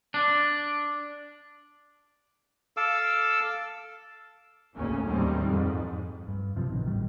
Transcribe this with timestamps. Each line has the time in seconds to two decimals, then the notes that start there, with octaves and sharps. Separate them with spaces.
0.14 D4
2.77 A4 F5 D6 E6
4.75 G#1 D2 C#3 G#3 A#3 C#4
5.06 D#2 A2 D#3 G3 G#3 C4
5.43 F2 G#2
6.28 G2
6.55 A#1 F#2 C3 F3
6.69 A1 B2 D#3
6.86 G#1 A2 D#3 G3